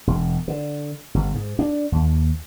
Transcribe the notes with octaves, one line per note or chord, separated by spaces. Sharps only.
E1
D3
G1
G#2
D4
D#2